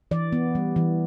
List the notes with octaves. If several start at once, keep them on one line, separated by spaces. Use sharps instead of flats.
E3 D5
B3
G3
E3